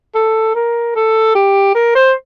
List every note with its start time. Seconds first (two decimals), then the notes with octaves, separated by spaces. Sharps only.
0.15 A4
0.55 A#4
0.96 A4
1.35 G4
1.75 A#4
1.95 C5